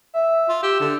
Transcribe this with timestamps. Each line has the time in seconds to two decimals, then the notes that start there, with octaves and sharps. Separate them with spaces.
0.14 E5
0.49 F4
0.63 G4 E6
0.80 D3